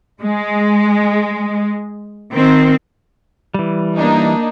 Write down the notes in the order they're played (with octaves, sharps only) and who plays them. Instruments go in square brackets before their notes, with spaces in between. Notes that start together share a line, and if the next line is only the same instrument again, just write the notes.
[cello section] G#3
D#3 C4
[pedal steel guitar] E3 G3
[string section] A#3 D4 D#4